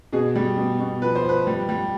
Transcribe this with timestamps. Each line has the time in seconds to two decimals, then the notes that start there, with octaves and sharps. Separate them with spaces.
0.13 B2 G#4
0.35 G3
0.57 B2
0.80 B2
1.02 F3 B4
1.15 C5
1.24 F3 B4
1.47 G3
1.69 G3